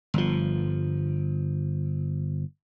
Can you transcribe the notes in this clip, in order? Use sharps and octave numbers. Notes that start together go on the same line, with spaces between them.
G1 F3